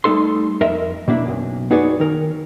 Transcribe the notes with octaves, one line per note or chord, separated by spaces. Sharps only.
G3 A3 D#4 A4 C6
F2 A#4 D#5 E5
B2 A#3 D4 E4
B1 F#2
D#4 F#4 G#4 B4 C#5 D5
D#3 A#4